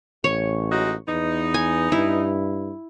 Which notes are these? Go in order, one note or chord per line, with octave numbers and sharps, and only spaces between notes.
A1 C#5
G#3 D#4 F#4
E2 B3 D#4
G#5
G2 E4